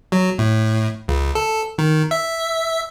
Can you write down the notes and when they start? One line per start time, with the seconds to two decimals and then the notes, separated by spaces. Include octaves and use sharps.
0.12 F#3
0.39 A2
1.08 C#2
1.35 A4
1.78 D#3
2.11 E5